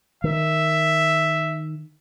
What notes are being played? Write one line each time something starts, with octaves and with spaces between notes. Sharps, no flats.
D#3 E5